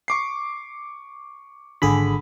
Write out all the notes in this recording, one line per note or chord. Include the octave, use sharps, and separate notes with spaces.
C#6 D6 C7
G#1 D3 G#4 B5